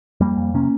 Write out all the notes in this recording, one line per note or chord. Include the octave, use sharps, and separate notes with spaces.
F2 G3 A#3
F2
C3 A#3 C#4